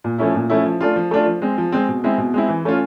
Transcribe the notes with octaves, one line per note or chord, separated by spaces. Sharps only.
A#2
F3 A3 C#4 E4
A#2
F3 A3 C#4 E4
F3
A3 D4 F4
F3
A3 D4 F4
F3
G#3 C4
F3
G#3 C4
B2
G#3 C4 E4
B2
G#3 C4 E4
E3
A3 C#4 F4